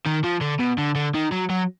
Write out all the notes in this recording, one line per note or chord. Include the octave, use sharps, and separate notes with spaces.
D#3
F3
D3
B2
D3
D3
D#3
F#3
F#3